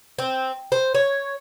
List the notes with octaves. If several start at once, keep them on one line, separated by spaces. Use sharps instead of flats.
C4
C5
C#5